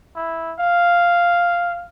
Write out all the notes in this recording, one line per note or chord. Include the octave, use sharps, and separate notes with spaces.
E4
F5